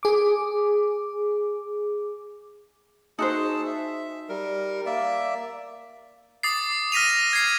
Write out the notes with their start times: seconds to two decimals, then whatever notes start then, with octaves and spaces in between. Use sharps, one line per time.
0.03 G#4 D6
3.19 D#4 F#4 G#4 C5 A5 E6
3.66 E5
4.29 G3 A#4
4.86 A#3 D5 E5
6.43 D6 D#6 A6 C7
6.92 F6 A#6 B6 D#7 F7
7.33 G#6 C7